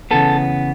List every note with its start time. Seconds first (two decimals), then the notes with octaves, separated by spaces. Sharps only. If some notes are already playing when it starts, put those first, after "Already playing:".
0.11 C#3 E3 B3 A4